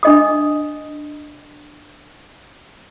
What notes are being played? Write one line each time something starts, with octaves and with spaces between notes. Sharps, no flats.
D4 D#5 D#6